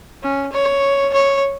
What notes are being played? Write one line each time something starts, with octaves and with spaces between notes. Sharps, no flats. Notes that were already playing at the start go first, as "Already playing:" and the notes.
C#4
C#5
C#5